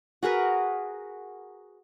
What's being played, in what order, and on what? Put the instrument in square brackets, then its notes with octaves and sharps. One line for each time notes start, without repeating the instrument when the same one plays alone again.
[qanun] F#4 G#4 A#4 B4